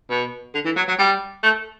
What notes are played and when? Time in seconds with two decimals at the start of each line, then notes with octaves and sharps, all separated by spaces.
0.11 B2
0.55 D3
0.65 E3
0.77 F#3
0.88 F#3
0.99 G3
1.43 A3